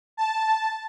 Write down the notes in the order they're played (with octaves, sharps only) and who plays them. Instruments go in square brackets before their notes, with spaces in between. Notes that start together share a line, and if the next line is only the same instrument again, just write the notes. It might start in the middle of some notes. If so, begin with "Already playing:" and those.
[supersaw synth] A5